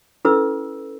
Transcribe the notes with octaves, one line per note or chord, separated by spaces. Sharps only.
C#4 E4 A4 B4 E6